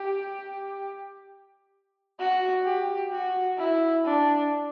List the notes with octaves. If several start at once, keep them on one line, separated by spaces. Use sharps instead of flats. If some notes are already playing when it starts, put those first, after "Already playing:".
Already playing: G4
F#4
G4
F#4
E4
D4